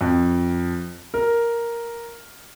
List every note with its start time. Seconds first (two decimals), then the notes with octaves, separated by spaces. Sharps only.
0.01 F2
1.14 A#4